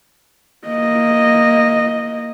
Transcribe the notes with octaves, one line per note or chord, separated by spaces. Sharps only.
A#3 D#5